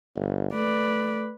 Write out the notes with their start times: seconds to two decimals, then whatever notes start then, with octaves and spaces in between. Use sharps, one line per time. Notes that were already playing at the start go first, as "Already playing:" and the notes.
0.16 G1
0.54 A3 B4 D5